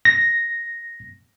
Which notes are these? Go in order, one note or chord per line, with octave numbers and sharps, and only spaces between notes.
A#6